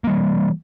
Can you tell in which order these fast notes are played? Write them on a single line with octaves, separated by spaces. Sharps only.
A#3 G3 E3